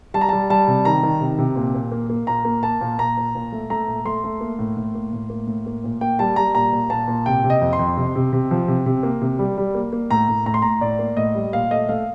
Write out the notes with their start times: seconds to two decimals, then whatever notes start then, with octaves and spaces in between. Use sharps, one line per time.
0.14 G3 A5
0.21 A#5
0.29 G3 A5
0.50 G3 A5
0.67 C3
0.85 D#3 A#5
1.03 D#3
1.20 C3
1.38 C3
1.56 A#2
1.74 A#2
1.92 A#3
2.10 A#3
2.27 A#2 A#5
2.45 A#3
2.63 A#3 A5
2.81 A#2
2.98 A#2 A#5
3.17 A#2
3.35 A#2
3.52 A3
3.70 A3 A#5
3.87 A#2
4.05 A3 C6
4.24 A3
4.41 A#3
4.59 A2
4.77 A2
4.95 A#3
5.13 A2
5.30 A#3
5.47 A2
5.66 A#3
5.84 A#2
6.01 A#3 G5
6.19 G3 A5
6.36 G3 A#5
6.55 A#2 A#5
6.72 A#2
6.90 A#2 A5
7.08 A#2
7.26 C3 G5
7.44 C3
7.50 D#5
7.61 F2
7.73 C6
7.79 F2
7.97 C3
8.15 C3
8.33 C3
8.51 F3
8.68 C3
8.86 C3
9.03 A#3
9.21 C3
9.39 G3
9.57 G3
9.75 A#3
9.93 A#3
10.10 A2 A#5
10.29 A2
10.46 A2 A#5
10.54 C6
10.62 A2 A#5
10.81 A2 D5
10.99 A#3
11.17 A2 D#5
11.35 G3
11.53 A#2 F5
11.71 A3 D#5
11.89 A3 F5